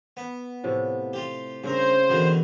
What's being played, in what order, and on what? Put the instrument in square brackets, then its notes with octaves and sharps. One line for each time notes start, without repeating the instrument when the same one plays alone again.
[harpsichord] B3
[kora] A2 C3 F3
[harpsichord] F4 G4
[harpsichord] G2 A#4 [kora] C#3 C4 [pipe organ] C5
[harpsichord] E2 D3 D#3 [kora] B2 B3